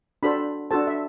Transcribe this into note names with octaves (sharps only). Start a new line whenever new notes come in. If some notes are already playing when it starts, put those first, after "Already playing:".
D4 F#4 A4 C5 B5
D4 F#4 A4 C5 A5
E5